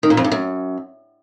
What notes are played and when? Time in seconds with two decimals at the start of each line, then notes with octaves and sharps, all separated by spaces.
0.03 D#3
0.10 A#2
0.17 F2
0.24 G2
0.32 F#2